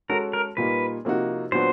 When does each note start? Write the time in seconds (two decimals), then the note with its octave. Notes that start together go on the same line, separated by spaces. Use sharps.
0.09 G#3 C#4 F#4 A4 A#4
0.33 A#4
0.57 A#2 G3 A#3 D#4 B4
1.05 C3 F3 A#3 D#4 F#4
1.52 A#2 F#3 B3 D4 F#4 C5